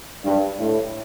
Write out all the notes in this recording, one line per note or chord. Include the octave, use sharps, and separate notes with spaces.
G2
A2